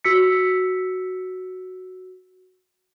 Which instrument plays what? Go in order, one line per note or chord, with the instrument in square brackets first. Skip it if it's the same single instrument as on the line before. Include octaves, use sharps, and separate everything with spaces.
[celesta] F#4 E6 B6 C#7